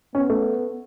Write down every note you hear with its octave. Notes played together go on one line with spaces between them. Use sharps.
B3 C#4
A3